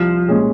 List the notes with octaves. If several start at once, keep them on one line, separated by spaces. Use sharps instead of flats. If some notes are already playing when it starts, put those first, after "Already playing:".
Already playing: C2 F3
A#2 G#3 C#4 G#4